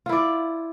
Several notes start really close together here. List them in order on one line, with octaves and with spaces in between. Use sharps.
F4 E4 D5